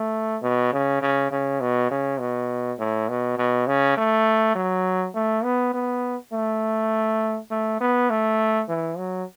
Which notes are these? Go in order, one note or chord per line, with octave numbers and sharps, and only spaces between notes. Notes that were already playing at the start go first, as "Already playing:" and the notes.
Already playing: A3
B2
C#3
C#3
C#3
B2
C#3
B2
A2
B2
B2
C#3
A3
F#3
A3
B3
B3
A3
A3
B3
A3
E3
F#3